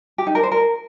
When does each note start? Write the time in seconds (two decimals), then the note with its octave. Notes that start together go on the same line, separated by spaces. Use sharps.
0.18 G4
0.27 D#4
0.35 A#4
0.43 C5
0.52 A#4